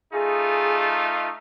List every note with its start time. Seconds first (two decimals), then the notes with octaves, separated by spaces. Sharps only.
0.14 A3 D#4 F4 G#4